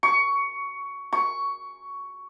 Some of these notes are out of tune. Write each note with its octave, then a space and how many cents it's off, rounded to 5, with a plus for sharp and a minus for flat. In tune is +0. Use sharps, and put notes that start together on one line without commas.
C#6 +15
C#6 +10